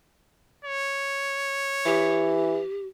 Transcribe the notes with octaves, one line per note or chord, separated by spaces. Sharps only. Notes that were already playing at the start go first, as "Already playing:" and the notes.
C#5
E3 G4